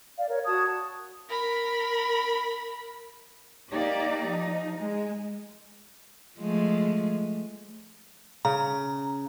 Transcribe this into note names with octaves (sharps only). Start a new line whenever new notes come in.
D5 F5
A#4 C#5
F#4 A5 D#6 G#6
A5
A#4 B5
A#3 D#4 G4 D5
F3 D#4
G#3
F3 G#3 A3
C#3 A#5